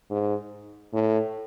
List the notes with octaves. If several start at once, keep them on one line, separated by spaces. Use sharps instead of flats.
G#2
A2